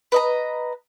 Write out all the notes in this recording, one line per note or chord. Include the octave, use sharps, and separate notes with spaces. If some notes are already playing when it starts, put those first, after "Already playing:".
B4 D#5 A#5